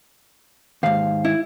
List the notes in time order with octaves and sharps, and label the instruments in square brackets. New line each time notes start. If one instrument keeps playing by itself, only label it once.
[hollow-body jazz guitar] D#2 G#2 [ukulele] F5
[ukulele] E4